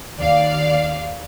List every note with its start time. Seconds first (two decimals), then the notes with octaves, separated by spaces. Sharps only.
0.20 D#2 D5 F5